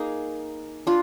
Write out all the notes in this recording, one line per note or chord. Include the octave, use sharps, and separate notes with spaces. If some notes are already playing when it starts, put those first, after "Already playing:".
Already playing: A#3 D#4 G#4
D4 F4